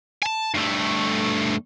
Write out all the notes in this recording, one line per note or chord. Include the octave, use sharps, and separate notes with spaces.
G#5 A5
G2 A3